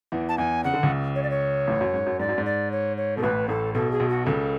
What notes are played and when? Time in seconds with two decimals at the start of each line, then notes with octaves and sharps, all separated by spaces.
0.12 E2 E3
0.29 A5
0.38 E2 E3 G#5
0.64 C#3 F#5
0.74 D3
0.83 C#2 C#3
1.15 C#5
1.23 D5
1.30 C#5
1.68 A1 A2
1.81 F#2
1.94 G#2
2.06 F#2
2.20 G#2 D5
2.29 F#2
2.38 G#2
2.45 D5
2.71 C#5
2.97 C#5
3.17 B2 A4
3.23 A1 A2 B4
3.49 A1 A2 A4
3.74 B1 B2 A4
3.91 G#4
4.00 B1 B2
4.09 F#4
4.26 C#2 C#3 A4